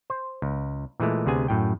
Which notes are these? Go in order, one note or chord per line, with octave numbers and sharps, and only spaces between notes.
C5
C#2
A#2 E3 G#3 A3
D2 C3 B3 G#4 G#5
F#2 A2 G5